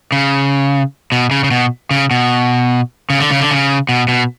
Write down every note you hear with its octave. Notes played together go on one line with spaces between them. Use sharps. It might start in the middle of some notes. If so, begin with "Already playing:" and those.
C#3
B2
C#3
C#3
B2
C#3
B2
C#3
D3
C#3
D3
C#3
B2
B2